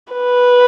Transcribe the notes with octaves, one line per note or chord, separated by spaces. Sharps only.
B4